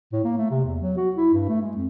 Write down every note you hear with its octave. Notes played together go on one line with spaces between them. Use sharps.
A2
A#3
A3
C3
E2
F#3
F#4
E4
G2
A3
G#3
F2